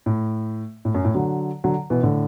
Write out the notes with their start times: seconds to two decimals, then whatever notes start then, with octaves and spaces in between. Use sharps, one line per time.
0.06 A2
0.85 A2
0.94 F#2
1.05 A2
1.15 D3 F#3
1.64 D3 F#3
1.90 B2 E3
2.03 A2 D3